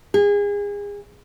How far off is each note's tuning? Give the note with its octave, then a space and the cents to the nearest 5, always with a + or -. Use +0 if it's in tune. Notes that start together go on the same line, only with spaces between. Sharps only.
G#4 -30